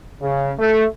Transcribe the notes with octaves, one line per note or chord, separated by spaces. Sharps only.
C#3
A3